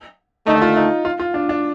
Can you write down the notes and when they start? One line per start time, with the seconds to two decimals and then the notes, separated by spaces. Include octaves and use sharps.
0.47 D#2 D3 A3 D#4
0.62 F4
0.77 D#4
1.05 F4
1.20 F4
1.34 D4
1.49 D4